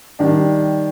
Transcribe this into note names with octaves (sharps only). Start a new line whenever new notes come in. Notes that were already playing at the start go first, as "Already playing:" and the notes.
D#3 G3 D4